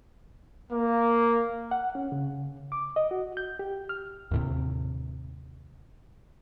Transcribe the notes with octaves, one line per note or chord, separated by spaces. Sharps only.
A#3
F#5
C#4
C#3
D6
D#5
F#4
G6
G4
F6
D#2 A2 C3